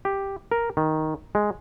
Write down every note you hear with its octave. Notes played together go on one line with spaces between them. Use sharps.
G4
A#4
D#3
G#3